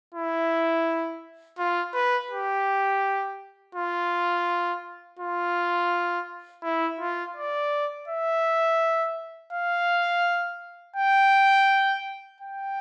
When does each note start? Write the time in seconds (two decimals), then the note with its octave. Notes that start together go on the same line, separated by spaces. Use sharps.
0.14 E4
1.59 F4
1.94 B4
2.31 G4
3.75 F4
5.19 F4
6.63 E4
7.00 F4
7.36 D5
8.08 E5
9.53 F5
10.96 G5
12.41 G5